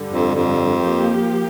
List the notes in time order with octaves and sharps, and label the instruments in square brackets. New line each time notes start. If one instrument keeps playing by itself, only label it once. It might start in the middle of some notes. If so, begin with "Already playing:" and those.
Already playing: [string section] G2 D3 G3
[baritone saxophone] F2
F2
[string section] F3 A#3 G4